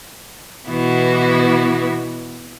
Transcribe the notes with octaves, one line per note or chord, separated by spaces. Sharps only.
B2 E3 B3 E4 F#4